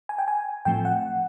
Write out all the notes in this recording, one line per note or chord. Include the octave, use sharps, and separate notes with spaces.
G#5
G5
G#5
A2 F3 A3 C4 G5
F#5